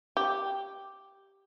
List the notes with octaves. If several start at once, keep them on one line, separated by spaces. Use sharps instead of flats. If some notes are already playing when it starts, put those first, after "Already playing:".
G4